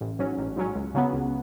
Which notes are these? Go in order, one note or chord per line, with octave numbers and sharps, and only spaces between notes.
A1
G#2 F#3 C#4
A1
G#2 F#3 C#4
C#2
C#3 F#3 B3
C#2